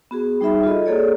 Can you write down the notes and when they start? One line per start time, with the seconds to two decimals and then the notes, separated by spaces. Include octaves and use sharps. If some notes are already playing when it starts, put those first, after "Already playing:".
0.11 B3 F#4 G#4
0.41 G3 D#4 G#4 E5 B5
0.63 F4 F#4 A4 D#5
0.86 A#3 G#4 A4 C#5 D5